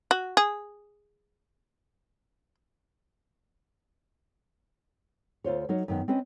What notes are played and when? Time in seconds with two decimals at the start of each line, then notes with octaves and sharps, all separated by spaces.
0.11 F#4
0.37 G#4
5.44 D2 F4 C5 C#5
5.69 F#3 D#4 A#4 C#5
5.88 F#2 D#3 B3
6.08 C4 C#4 B4 D#5